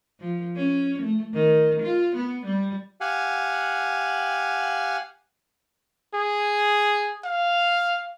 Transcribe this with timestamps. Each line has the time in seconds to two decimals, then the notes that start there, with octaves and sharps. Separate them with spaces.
0.19 F3
0.56 C#4
1.02 A3
1.34 D#3
1.82 F4
2.16 B3
2.46 G3
3.01 G4 F5 F#5 G#5
6.14 G#4
7.24 F5